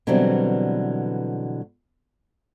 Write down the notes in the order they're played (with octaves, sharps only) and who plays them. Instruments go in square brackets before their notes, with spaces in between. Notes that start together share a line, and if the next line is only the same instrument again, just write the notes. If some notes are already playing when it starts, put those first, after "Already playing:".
[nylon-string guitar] B2 D3 E3 F#3 G3 C4